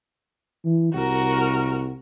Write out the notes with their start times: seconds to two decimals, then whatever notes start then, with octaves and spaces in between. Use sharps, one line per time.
0.65 E3
0.94 C2 F#4 A#4